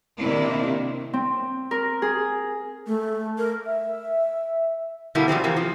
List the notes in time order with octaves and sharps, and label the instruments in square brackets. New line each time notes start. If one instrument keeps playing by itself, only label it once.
[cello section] C3 D#3 A#3 C4 D4 E4
[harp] C4
A#4
G#4
[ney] A3
A#4
[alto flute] E5
[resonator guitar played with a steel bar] B2 D3 G3 A#3 E4
C#3 F3 G3 C4
C3 E3 A#3
F3